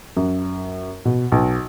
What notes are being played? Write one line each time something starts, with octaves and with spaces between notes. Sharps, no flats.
F#2
B2
B1